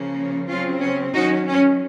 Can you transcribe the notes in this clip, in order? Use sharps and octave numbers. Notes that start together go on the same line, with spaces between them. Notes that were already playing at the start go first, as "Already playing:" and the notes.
Already playing: C#3 F3 A#3 C#4
C#3 F#3 C4 C#4 F4
C#4
D#3 F#3 C#4 D#4 F#4
C#4